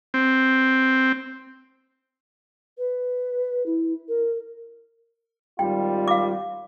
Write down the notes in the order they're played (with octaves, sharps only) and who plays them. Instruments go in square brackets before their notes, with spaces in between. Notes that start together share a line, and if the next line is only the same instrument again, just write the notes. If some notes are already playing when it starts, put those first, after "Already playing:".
[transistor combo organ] C4
[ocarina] B4
E4
A#4
[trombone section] G#1 G3 F4 [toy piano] G5
[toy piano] F5 D6